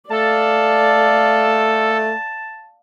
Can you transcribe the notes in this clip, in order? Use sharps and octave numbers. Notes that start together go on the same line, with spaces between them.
A3 A4 D5 F5 A5